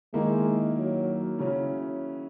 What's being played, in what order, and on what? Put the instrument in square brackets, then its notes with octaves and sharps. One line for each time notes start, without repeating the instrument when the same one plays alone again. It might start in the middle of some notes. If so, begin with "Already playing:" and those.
[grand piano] D#3 A#3 E4 [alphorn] G#3
[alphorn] F#3
[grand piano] C#3 F#3 C#4 E4